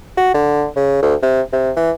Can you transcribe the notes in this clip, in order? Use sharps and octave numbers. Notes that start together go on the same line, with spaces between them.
F#4
D3
C#3
D2
C3
C3
E3